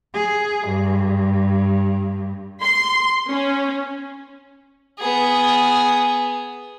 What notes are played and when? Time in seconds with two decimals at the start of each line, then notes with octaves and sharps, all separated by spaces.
0.14 G#4
0.68 G2
2.63 C6
3.27 C#4
4.99 B3 G#4